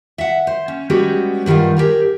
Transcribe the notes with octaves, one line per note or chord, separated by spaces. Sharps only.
E5 F#5
C5
C#4
G3 G#3 B3 C#4 F#4 G4
G2 D#3 G3 F4 F#5
G4 G#4 A#4